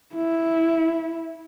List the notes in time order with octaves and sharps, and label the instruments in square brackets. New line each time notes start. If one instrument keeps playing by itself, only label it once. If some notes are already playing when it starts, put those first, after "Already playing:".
[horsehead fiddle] E4